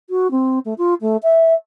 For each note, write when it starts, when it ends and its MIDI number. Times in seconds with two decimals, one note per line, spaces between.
0.10 0.31 66
0.31 0.59 60
0.65 0.74 57
0.78 0.94 65
1.01 1.17 57
1.23 1.54 76